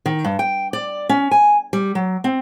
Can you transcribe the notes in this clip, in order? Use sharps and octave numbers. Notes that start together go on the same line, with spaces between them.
D#3
G2
G5
D5
C#4
G#5
G3
F#3
C4